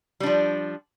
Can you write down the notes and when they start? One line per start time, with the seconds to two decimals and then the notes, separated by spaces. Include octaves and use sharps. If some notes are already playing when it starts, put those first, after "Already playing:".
0.20 G3
0.23 D4
0.26 F3